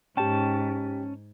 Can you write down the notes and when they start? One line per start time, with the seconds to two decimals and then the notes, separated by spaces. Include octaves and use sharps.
0.17 G#2 C#4 G4 G5 A5